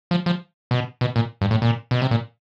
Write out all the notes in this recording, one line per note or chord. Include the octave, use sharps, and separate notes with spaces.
F3
F3
B2
B2
A#2
G2
A2
A#2
B2
C3
A#2